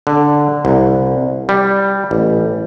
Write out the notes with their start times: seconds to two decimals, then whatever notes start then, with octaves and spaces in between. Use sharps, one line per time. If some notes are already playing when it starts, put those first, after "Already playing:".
0.07 D3
0.65 C2
1.49 G3
2.11 A1